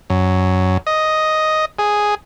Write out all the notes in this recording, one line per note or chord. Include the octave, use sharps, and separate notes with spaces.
F#2
D#5
G#4